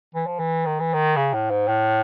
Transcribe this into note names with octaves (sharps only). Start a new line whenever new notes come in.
E3
F3
E3
D#3
E3
D#3
C#3
A2
G#2
A2